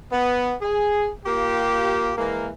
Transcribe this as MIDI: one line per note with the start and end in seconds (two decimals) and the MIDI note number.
0.12 0.55 59
0.62 1.10 68
1.26 2.12 58
1.26 2.12 65
1.26 2.12 67
2.17 2.50 52
2.17 2.50 56
2.17 2.50 58